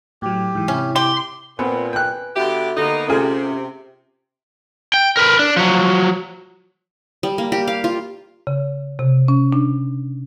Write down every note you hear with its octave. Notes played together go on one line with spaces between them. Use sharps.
A2 F#3 G4
G#2 E3
C3 C#4 E4
G4 C6 D6
A#2 B3 C4 B4 G#5
G5 F#6
D3 B3 F#4 G4 E5
D3 A#3 B3 D#4 D#6
C3 A3 C#4 F4 G#4
G5
A#4 B4
D4
F3 F#3
G3
A#3
G4
F5
F4
C#3
C3
C#4
D4